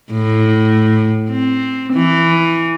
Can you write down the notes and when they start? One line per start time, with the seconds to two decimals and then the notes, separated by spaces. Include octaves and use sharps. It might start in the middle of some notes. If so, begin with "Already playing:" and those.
0.11 A2
1.30 C4
1.93 E3